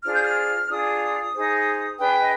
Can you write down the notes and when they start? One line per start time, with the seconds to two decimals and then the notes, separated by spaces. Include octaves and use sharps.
0.03 D4 F4 G#4 C5 F6
0.13 G6
0.23 F6
0.69 D4 F4 G#4 D#6
1.34 D#4 G#4 C5
1.98 D4 G#4 B4 G5
2.20 D#5